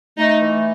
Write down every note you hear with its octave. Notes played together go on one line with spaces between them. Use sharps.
A3 D#4
E3